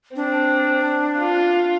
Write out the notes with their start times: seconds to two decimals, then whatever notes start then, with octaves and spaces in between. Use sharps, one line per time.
0.16 C4 D4
1.19 F4